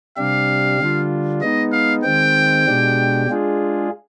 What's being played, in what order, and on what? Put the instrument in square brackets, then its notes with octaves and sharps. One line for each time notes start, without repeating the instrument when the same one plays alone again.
[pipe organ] C3 G3 D4 G4 [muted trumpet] F5
[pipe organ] D3 G3 D4 F4
[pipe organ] G#3 B3 D#4 [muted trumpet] D#5
[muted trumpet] F5
[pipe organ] D#3 G#3 C4 [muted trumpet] G5
[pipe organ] B2 G#3 D4 G4
G#3 D4 F4 G#4